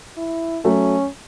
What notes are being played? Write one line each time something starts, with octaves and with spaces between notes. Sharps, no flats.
E4
F#3 A3 C#4